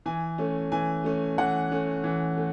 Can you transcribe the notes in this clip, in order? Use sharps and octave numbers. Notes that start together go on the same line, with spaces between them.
E3 G#5
A3 C#4
E3 G#5
A3 C#4
E3 F#5
A3 C#4
E3
A3